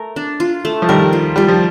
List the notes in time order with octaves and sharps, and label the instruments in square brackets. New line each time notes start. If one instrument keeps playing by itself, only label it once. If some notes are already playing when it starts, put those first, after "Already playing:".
Already playing: [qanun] A3 A#4
D4
F4
A3
[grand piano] F3
[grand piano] D#3 G3 [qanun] A#4
[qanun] F4
[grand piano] G3 [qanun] F4
[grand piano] F3